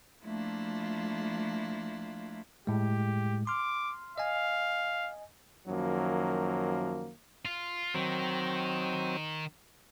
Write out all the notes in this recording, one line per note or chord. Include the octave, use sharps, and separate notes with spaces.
F3 A3 A#3 D4 E4 F4
A2 G#3 G4
C6 D6 F6
D#5 F5 G#5
F#2 D#3 F3 F#3 A#3
F4
D#3 F#3 C4